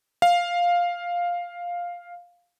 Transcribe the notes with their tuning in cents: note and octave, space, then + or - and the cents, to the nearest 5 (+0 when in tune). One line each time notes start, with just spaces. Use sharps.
F5 +5